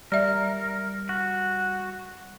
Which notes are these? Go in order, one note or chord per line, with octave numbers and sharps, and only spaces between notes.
G3 A#4 D5 E5
F#4